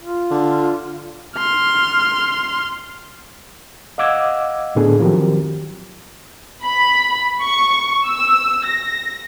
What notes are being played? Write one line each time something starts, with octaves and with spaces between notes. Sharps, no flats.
F4
D3
C6 F6
D#5 F5 F#5 D6 E6 G#6
A2 D3 B3 D4 G#4 A4
D#3 F3 F#3 C4 G4 A#4
B5
C#6
E6
A#6